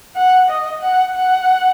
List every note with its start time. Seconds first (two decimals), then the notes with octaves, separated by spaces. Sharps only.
0.16 F#5
0.49 D#5
0.82 F#5
1.15 F#5